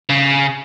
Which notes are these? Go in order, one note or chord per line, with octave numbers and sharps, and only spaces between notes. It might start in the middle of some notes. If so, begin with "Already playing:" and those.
C#3